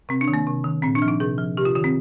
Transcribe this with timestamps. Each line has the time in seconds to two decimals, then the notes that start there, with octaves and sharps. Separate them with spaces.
0.09 C3 C4
0.21 D4
0.28 D#3
0.34 A#3
0.47 C3
0.64 D#3
0.82 A#2 C4
0.95 D4
1.02 F3
1.08 D#4
1.20 C3 G#4
1.38 F3
1.57 C3 G4
1.65 F4
1.76 D#3 F4
1.84 C4